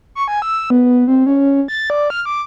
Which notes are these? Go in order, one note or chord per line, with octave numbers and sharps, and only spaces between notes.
C#6
G#5
E6
B3
C4
C#4
A6
D5
F6
D6